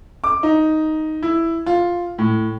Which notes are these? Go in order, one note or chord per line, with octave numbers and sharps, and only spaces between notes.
D6
D#4
E4
F4
A2